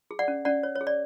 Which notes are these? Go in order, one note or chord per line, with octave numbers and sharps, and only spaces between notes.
G#4
D5 F#5
C#4
C#4 D5 F#5
C#5
C#5
G#4
D5